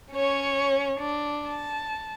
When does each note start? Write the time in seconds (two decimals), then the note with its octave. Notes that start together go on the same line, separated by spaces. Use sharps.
0.12 C#4 C#5
0.99 D4
1.49 A5